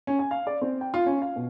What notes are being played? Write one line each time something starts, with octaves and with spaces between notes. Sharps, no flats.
C#4
G#5
F5
D5
C4
G5
F4
C#4
F5
B2